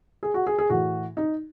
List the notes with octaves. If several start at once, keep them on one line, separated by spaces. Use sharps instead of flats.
G#4
F#4
G#4
G#4
A2 E3 F#4
D#4